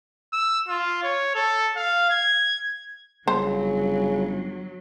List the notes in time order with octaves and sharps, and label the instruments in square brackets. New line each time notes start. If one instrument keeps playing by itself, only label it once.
[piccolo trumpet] E6
F4
C#5
A4
F5
G#6
[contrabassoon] G1 [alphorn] C#3 [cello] F#3 [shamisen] C5